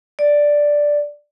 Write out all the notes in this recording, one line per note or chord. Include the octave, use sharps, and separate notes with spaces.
D5